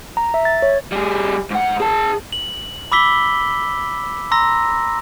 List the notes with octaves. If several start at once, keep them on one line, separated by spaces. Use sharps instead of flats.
A#5
E5
A6
C#5
G3 G#4
G#2 F#5
G#4 A5
F#7
B5 D6 E6 B6 G7
A#5 C6 E6 A#6